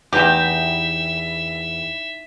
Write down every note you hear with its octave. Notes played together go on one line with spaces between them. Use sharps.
E2 D#4 G4 E5 G5